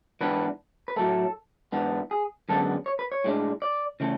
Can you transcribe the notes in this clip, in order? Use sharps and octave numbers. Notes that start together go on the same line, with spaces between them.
G#2 E3 B3 D4 B4
B4
A2 F#3 A3 A4
G#2 E3 B3 D4
G#4
F#2 D3 G#3 B3 D4 A4
C#5
B4
C#5
A2 G#3 D4
D5
C#3 E3 A3